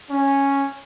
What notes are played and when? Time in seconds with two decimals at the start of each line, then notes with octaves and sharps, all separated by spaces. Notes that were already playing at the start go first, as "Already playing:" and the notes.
0.10 C#4